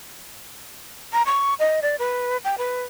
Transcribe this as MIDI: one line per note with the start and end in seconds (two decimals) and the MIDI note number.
1.13 1.23 82
1.26 1.54 85
1.59 1.80 75
1.82 1.96 74
1.99 2.37 71
2.44 2.56 79
2.58 2.83 71